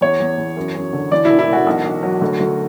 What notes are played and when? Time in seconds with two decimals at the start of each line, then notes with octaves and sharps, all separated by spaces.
0.01 E2 C#5
0.20 E2
0.38 E2
0.57 F#2
0.75 F#2
0.93 D3
1.12 E3 D5
1.25 E4
1.30 E1
1.39 E4
1.49 E1 F#4
1.67 B1
1.85 B1
2.03 F#3
2.21 D2
2.40 D2